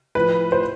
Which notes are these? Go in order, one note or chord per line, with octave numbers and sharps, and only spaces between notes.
A2 F3 B4
C5